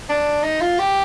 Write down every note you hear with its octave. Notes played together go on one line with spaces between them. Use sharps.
D4
D#4
F4
G4